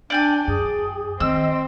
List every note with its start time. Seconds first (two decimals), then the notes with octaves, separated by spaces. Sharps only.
0.10 D4 D5 G5 G#5
0.47 F#2 G#4
1.20 D#3 C4 D#5 E6